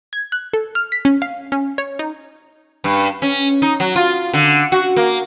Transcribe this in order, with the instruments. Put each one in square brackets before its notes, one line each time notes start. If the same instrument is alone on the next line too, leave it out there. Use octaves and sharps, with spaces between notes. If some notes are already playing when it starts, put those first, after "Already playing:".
[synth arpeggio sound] G#6
F#6
A4
F6
B6
C#4
F5
C#4
C#5
D#4
[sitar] G2
C#4
D#4
F#3
F4
D3
F#4
A#3